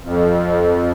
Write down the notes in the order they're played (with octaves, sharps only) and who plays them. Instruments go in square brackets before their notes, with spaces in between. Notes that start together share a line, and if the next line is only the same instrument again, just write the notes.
[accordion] F2